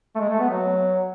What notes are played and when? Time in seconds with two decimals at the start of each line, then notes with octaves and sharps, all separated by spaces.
0.15 A3
0.19 G#3
0.29 A3
0.40 B3
0.50 F#3